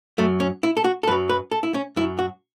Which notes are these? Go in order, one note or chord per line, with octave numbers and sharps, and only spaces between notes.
F#2 F#3 A3
C#4
E4
A4
F#4
A4
F#2 F#3 B4
B4
A4
E4
C#4
F#2 F#3 E4
F#4